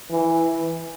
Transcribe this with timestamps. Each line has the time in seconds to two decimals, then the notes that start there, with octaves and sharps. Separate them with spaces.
0.11 E3